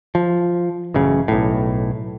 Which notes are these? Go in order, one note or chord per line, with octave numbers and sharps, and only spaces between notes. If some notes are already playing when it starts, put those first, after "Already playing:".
F3
A1 F#2 C#3
B1 A2